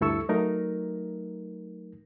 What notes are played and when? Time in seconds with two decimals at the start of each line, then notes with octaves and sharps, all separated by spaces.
0.01 D2 G2 E4 A4 C#6 E6
0.29 F#3 A3 D#4 A#4